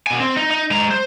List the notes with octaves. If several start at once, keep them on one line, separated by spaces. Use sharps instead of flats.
B2 G#5
C4
D#4
D#4
G#3 A#5
C5